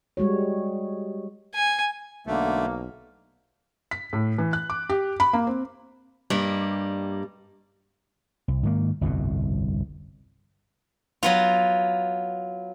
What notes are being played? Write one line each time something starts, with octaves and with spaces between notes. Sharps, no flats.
G3 G#3 F#4 C#5
G#5
B1 D3 A3 A#3
B6
A2
E3
F#6
D6
G4
B5
A#3
C4
G2 G3 A#3 D#5
C2
G#2 D#3 A#3
G1 C2 F2 B2
F#3 B3 F4